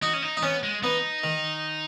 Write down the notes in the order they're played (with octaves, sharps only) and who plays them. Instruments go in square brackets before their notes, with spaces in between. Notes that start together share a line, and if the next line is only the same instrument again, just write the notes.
[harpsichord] D#4 [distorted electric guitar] F#4
[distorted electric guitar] C#4
D#4
[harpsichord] D#4
[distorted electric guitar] B3 [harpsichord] C#4
[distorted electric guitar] G#3
[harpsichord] B3 [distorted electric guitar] D#4
[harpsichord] D#3